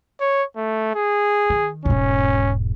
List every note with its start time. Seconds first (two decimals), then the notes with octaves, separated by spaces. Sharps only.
0.21 C#5
0.57 A3
0.95 G#4
1.50 D#3
1.85 E1 G#2 C#4